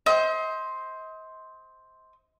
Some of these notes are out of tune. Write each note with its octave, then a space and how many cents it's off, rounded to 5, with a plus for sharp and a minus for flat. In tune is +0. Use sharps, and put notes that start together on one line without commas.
C5 +0 D#5 +40